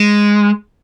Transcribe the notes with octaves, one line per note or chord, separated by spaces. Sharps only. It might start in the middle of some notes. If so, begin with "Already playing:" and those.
Already playing: G#3